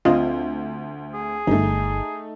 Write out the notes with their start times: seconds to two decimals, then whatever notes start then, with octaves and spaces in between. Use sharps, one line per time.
0.05 D2 C4 F4 D#5
1.14 G#4
1.47 G1 A3 D#4